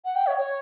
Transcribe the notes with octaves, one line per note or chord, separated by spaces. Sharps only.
F#5
G5
C#5
C#5